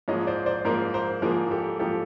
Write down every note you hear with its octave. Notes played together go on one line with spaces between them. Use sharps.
G#2 F3 A#3 C#5 D#5
C5 D5
C5 D5
G#2 F3 A#3 A#4 C5
A#4 C5
G#2 F3 A#3 G#4 A#4
G4 A4
G#2 F3 A#3 G4 A4